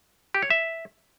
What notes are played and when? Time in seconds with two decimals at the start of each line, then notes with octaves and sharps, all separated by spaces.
0.34 G4
0.42 C#5
0.50 E5